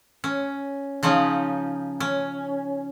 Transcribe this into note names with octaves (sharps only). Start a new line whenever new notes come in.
C#4
C#3 F3 C#4 D#4
C#4